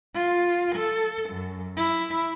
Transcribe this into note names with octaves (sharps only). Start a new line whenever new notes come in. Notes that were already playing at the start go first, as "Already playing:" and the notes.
F4
A4
F#2
E4